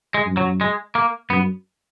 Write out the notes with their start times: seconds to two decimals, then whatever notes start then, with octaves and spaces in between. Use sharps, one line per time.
0.14 G#3
0.26 F#2
0.37 F#3
0.61 G#3
0.95 A#3
1.30 F#2 B3